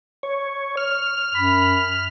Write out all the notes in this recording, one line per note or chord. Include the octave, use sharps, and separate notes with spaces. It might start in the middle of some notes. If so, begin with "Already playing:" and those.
C#5
F6
F#2 B5